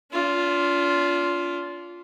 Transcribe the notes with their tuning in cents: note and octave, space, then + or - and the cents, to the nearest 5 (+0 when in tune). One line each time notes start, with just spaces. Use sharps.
D4 -40 F4 +0